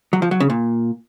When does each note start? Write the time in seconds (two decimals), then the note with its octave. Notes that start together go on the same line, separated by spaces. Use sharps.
0.13 F#3
0.22 F3
0.31 F#3
0.40 C#3
0.50 A#2